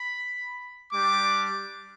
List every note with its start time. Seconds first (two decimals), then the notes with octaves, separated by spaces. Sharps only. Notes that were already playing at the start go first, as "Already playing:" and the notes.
Already playing: B5
0.92 G3 D4 G4 D6